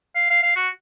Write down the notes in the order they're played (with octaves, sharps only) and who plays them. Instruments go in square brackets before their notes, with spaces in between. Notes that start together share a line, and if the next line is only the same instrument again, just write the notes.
[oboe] F5
F5
F5
F#4